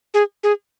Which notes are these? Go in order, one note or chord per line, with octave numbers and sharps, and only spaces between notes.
G#4
G#4